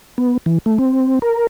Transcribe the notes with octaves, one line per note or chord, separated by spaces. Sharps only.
B3
E3
A3
C4
A#4